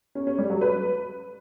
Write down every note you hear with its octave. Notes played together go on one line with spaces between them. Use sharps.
C#4
C#4
G3
F#3
B4